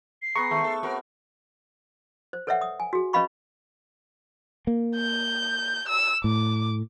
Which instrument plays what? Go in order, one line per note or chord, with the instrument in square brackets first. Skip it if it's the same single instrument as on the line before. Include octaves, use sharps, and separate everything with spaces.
[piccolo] C7
[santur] B3 A#5 [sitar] G#4 [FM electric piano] C#6
[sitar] G#2 D#3 [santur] A3
[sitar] A4
C4 F#4 A#4
[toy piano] C5
A4 B4 C#5 D5 E5 F#5
D#6
G#5
F#4 G#4
C#4 B4 D#5 F5 B5 C#6
[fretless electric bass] A#3
[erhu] G6
E6
[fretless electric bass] A2 [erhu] D6